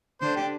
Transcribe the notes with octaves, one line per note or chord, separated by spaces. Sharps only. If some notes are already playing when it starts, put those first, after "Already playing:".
D3 D4 C5
G4